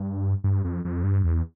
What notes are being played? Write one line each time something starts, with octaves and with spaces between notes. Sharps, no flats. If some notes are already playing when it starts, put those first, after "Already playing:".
Already playing: G2
G2
F2
F2
G2
E2